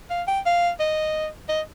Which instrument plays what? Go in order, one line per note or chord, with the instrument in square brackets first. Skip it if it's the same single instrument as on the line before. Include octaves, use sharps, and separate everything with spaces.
[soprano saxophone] F5
G5
F5
D#5
D#5